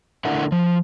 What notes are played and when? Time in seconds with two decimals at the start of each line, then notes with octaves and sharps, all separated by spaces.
0.25 D3 A3 D4 E4 A#4 F#5
0.52 F3